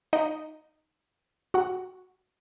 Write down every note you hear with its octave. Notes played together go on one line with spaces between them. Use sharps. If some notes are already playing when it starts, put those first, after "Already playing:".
D#4 D#5
F#4 F#5